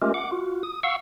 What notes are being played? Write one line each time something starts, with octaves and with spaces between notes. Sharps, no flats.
G#3 A3 C#4 F4 G4 A#4
F#5 D6
F4 F#4
D#6
F5 F#5 C#6 E6